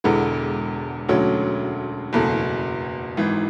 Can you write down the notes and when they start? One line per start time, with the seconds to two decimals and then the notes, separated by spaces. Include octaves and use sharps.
0.04 E1 E2 D3 G#3 B3
1.08 E1 D2 D3 F#3 C#4
2.13 F#1 E2 B2 A3
3.17 G#1 G#2 E3